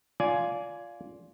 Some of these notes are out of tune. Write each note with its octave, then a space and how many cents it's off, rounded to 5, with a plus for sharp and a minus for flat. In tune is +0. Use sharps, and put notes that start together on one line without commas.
F4 +0 D5 -20 G#5 +10